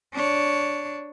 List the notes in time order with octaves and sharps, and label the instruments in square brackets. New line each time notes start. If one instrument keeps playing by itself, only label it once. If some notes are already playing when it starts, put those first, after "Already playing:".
[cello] D4 C#5